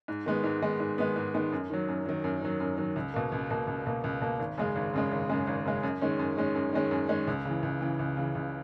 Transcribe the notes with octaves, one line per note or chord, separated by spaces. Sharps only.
G#2
D#3 G#3 B3
G#2
D#3 G#3 B3
G#2
D#3 G#3 B3
G#2
D#3 G#3 B3
F#2
D#3 F#3
F#2
D#3 F#3
F#2
D#3 F#3
F#2
D#3 F#3
C#2
B2 A#3
C#2
B2 A#3
C#2
B2 A#3
C#2
B2 A#3
G#1
F#2 C#3 G#3
G#1
F#2 C#3 G#3
G#1
F#2 C#3 G#3
G#1
F#2 C#3 G#3
F#2
D#3 G#3 C#4
F#2
D#3 G#3 C#4
F#2
D#3 G#3 C#4
F#2
D#3 G#3 C#4
C#2
C#3 E3
C#2
C#3 E3
C#2
C#3 E3
C#2